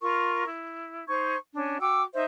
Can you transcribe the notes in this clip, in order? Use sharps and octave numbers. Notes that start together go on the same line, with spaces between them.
F4 A#4 C#6
E4
D#4 C5 C#6 G#6
C#4 D4
F#4 G5 D6 E6
D#4 C5 D#5 E5